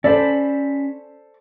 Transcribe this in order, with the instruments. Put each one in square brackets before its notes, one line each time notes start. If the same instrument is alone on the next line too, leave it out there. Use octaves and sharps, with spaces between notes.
[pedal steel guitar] C#4 B5 [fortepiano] A4 C5 [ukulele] D5